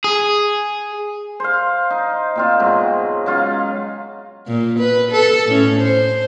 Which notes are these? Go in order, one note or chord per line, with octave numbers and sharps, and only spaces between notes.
G#4
C5 F5
D#4
A#2 C4 F4
G#2 B2 F#3
C#3 F#3 F4
A#2
B4
A4
A2 C#4
C5